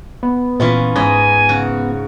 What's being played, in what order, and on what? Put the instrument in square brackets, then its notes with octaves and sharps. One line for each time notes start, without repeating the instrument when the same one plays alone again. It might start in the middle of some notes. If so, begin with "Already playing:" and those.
[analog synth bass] B3
[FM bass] A#2 [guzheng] E3 C#4 F4
[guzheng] G#2 D#5 [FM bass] C#4 [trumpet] G#5
[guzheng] C#3 F#4